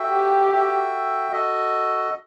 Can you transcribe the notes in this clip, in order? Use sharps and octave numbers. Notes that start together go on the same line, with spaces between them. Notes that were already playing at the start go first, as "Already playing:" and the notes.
Already playing: F#4 A4 E5 G5
G4
F#4 A4 E5 G5
F#4 A4 D#5